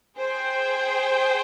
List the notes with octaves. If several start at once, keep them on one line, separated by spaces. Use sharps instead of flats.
G#4 C5 G5